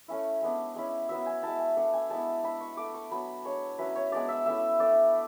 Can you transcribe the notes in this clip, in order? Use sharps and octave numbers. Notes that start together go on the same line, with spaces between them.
A3 C#4 E4
G#3 B3 D4
G#3 C#4 E4
F#3 B3 E4 E5
G#5
G#3 B3 E4 A5
G#5
A3 D4 F#5
G#5
G#3 B3 E4 A5
G#3 D4 B5
C#6
A3 D4 D6
C#6
F#3 B3 D4 B5
G#3 D4 C#5
F#3 C#4 E4 B4
C#5
G#3 B3 D4 D5
E5
A3 C#4 E4 E5
A3 D4 D5